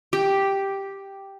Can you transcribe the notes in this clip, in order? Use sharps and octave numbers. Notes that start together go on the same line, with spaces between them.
G4